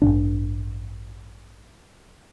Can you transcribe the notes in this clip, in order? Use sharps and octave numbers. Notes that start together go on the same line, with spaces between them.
A1 G2 B2 D4